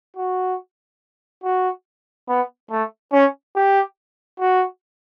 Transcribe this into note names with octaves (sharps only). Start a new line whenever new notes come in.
F#4
F#4
B3
A3
C#4
G4
F#4